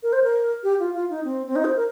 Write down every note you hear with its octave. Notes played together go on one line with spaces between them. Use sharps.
A#4
C5
A#4
G4
F4
F4
D#4
C4
C4
D#4
C5
A#4